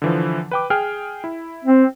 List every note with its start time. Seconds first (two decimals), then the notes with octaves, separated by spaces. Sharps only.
0.02 D3 E3 F3
0.51 B4 G5 D6
0.70 G#4 G5 F6
1.24 E4
1.65 C4